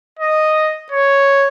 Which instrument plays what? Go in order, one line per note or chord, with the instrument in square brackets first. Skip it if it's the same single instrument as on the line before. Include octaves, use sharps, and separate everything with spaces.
[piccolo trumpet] D#5
C#5